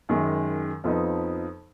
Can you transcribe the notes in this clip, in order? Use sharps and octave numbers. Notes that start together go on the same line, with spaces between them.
F#2 D#3 G#3
F2 F3 B3 D#4